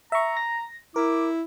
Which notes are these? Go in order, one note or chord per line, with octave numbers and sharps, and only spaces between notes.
E5 A#5 C#6
A#6
E4 A#4 D6